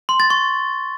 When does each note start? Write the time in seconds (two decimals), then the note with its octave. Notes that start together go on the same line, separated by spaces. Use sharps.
0.09 C6
0.20 A6
0.30 C#6